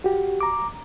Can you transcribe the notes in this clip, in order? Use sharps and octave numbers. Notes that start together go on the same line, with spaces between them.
F#4 G4
A#5 D6